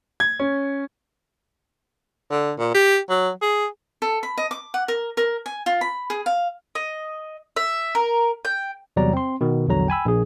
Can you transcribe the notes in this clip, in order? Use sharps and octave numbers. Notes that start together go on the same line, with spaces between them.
G#6
C#4
D3
A#2
G4
F#3
G#4
A4
B5
D#5
D6
F#5
A#4
A#4
G#5
F4
B5
G#4
F5
D#5
E5
A#4
G5
E2 C3 F#3 G3 D5 A#5
C4 C6
B2 D#3
A#1 E2 D3 F#3 A#5
G5 G#5 B5 E6
A#1 G#4